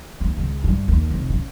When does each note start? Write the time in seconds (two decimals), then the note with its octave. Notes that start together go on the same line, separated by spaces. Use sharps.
0.21 D#2
0.37 C#2
0.64 G2
0.88 D#2
1.11 F1
1.30 C#3